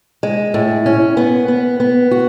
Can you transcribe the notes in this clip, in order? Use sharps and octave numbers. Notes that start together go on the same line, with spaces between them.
G#3
A2
C#4
B3
B3
B3
F#4